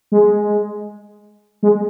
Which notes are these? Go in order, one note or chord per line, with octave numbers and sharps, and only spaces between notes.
G#3
G#3